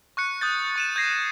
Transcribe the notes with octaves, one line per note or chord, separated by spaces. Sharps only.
C#6 F#6 C#7
D#6 G6 A6
C#6 D#7 E7
G6 G#6 A#6 C7